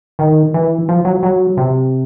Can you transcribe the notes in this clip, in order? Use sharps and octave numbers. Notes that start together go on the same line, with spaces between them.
D#3
E3
F3
F#3
F#3
C3